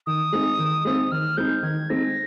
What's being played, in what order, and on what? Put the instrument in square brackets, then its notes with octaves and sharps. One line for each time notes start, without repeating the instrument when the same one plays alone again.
[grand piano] D#3 [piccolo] D#6
[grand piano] G#3 C4 D#4
D#3
G#3 C4 D#4
[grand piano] D#3 [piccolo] F6
[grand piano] G#3 C4 D#4 [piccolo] G6
[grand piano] D#3 [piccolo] G#6
[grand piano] G#3 C4 D#4 [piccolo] A#6